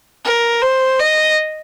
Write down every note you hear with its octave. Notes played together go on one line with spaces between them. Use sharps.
A#4
C5
D#5